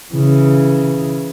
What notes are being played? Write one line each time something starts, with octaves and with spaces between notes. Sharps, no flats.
C#3 E3